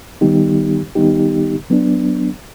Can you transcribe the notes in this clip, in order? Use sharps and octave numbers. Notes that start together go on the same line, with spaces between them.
D#3 G3 B3 D#4 G4
D#3 G3 B3 D#4 G4
F#3 B3 D4